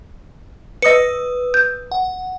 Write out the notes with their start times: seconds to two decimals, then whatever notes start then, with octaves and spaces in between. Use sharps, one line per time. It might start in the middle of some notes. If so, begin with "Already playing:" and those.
0.82 B4 D#5 D#6 E6 C#7
1.54 G6
1.92 F#5